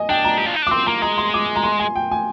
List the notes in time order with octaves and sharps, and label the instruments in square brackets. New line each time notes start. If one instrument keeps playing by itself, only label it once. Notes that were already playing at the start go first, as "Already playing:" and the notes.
Already playing: [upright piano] D#5 G#5
[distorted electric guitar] D4 [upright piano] G5
[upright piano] A#5
[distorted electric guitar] G4
F4
D#4
D4
[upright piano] D6
[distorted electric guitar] C4 [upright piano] C6
[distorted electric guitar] A#3 [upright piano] A#5
[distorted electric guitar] G#3 [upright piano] A#5
[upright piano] C6
D6
A#5
C6
G#5
G5
G#5